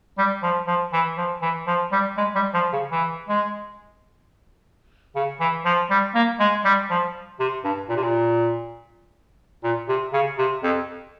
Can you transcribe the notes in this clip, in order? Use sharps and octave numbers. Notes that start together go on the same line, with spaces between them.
G3
F3
F3
E3
F3
E3
F3
G3
G#3
G3
F3
C#3
E3
G#3
C#3
E3
F3
G3
A#3
G#3
G3
F3
C3
G2
A#2
C3
A#2
A#2
C3
C#3
C3
F2